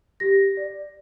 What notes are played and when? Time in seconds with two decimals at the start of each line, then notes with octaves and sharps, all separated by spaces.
0.20 G4 A#6
0.57 D5